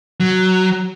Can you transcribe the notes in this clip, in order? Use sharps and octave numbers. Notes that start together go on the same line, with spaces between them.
F#3